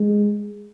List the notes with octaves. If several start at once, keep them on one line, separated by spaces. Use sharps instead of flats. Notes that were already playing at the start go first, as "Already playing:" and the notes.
Already playing: G#3